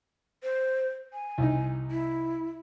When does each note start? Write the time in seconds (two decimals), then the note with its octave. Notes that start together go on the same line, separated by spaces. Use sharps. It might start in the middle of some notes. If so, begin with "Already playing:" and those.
0.43 C5
1.13 G#5
1.38 C2 D#4
1.91 E4